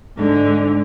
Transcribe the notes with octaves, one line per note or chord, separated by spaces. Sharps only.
G#2 D3